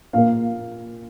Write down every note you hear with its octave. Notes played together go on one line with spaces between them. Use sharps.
A#2 A#3 F5